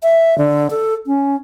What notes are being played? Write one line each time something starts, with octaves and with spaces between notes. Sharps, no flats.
E5
D3
A4
C#4